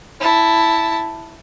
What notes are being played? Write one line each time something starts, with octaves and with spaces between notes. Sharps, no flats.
E4 A5